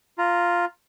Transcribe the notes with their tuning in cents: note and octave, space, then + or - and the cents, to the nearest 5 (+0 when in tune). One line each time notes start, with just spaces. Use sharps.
F4 +0 A#5 +0